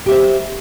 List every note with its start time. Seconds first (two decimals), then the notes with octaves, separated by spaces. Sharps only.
0.06 G4
0.09 E5
0.11 C5